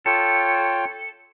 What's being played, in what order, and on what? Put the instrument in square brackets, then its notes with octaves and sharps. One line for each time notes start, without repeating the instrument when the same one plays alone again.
[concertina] F4 C#5 G5 [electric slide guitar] A4